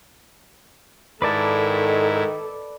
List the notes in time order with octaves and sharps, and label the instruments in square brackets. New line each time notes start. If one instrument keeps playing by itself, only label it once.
[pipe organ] G#2 E4 [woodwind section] D#3 [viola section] A4 [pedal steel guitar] B4 D5 A5